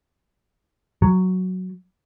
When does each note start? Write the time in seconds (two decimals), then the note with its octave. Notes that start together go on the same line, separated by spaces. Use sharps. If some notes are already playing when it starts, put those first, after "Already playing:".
1.02 F#3